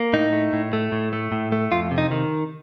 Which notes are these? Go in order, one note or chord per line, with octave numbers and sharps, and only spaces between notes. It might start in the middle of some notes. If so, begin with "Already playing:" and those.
Already playing: A#3
A2 D#4
A3
A2
A3
A2
A3
A2
A3
F2 F4
C3
D#4
D#3